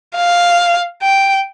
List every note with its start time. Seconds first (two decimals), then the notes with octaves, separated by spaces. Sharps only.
0.16 F5
1.03 G5